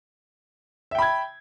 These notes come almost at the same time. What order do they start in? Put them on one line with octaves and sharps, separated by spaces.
E5 G5 B5 G#6